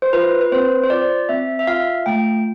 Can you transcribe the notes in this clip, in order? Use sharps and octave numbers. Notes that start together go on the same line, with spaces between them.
C5
F4 B4
B4
C4 C5
C5
F4 D5
C4 E5
E5
F4 F5
A3 G5